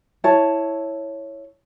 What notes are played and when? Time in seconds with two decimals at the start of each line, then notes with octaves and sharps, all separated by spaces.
0.24 E4 C#5 A5